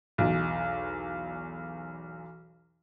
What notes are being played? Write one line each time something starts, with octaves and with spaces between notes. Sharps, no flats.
B1 E2